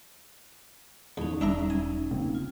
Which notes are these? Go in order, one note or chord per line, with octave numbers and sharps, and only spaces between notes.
E2 C#4 D#4
E1 D4 E5 A#5
G#5
C#3 A#3 C4
F4